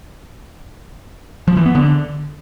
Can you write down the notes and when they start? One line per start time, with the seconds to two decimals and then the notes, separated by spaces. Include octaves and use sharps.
1.48 F3
1.57 E3
1.66 B3
1.75 D3